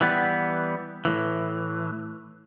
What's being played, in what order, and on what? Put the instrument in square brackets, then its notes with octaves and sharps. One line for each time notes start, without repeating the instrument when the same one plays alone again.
[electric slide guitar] E3 G3 B3
A2 E3